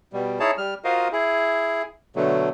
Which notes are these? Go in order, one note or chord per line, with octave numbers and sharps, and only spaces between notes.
B2 G3
D#4 E4 G#4 C#5 A5
G3 F6
F4 F#4 A#4 C5 D#5 F5
E4 G#4
B2 D3 F#3 A3